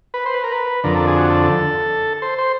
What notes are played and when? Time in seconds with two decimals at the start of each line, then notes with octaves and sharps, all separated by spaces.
0.14 B4
0.26 C5
0.34 B4
0.44 A#4
0.52 B4
0.84 F2 D3 A#4
0.96 A4
1.07 G#4
1.18 F#4
1.30 A4
2.22 C5
2.38 C5